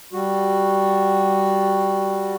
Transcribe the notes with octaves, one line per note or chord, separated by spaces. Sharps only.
G3 F#4